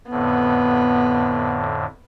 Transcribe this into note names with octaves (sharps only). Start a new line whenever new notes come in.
F2 A2 D3 B3